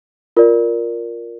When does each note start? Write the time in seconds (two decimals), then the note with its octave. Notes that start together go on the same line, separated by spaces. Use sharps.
0.37 F4 A#4 D5